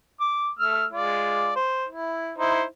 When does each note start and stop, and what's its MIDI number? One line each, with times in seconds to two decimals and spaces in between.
0.21 0.49 86
0.59 0.85 57
0.59 0.85 88
0.59 0.85 89
0.93 1.54 56
0.93 1.54 65
0.93 1.54 74
1.56 1.85 72
1.89 2.33 64
2.38 2.63 63
2.38 2.63 64
2.38 2.63 72